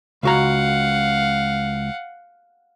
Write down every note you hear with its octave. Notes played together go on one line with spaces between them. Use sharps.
C#2 F#4 F5 F#5 A#5